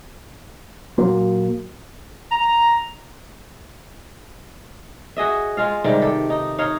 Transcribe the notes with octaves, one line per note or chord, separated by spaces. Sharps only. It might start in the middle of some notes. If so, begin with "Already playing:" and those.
A#2 F#3 A#3 F#4
A#5
F#4 G#4 D#5 E5
G#3 F4 F5
G#2 C3 D#3 G3
G4 A4
D#4
D#4 C#5 F5